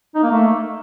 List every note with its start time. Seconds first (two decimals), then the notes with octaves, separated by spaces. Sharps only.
0.15 D#4
0.23 A#3
0.31 A3